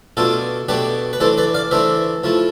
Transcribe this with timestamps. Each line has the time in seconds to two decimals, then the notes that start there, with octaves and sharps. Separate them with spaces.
0.17 B2 A3 D4 F4 A4
0.69 B2 A3 D4 G4 B4
1.13 B4
1.20 E3 A3 D4 A4 C5
1.38 B4 D5
1.54 D5 F5
1.71 E3 A3 D4 C5 E5
2.24 F3 A3 E4